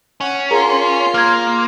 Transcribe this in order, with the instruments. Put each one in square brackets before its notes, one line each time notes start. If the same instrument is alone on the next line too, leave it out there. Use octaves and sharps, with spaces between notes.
[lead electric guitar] C#4 [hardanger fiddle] F#5
[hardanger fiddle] F4 C6 [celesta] G#4 A#4 A#5
[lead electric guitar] A#3 [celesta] F6 G#6